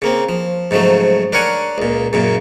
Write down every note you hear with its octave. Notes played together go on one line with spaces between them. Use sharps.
C#3 A#3 C4
F3
G#2 C#3 F3 F#3 A3
D4 A#4 C#5 F#5 G#5
C#2 A#2
F#2 A#2 C#3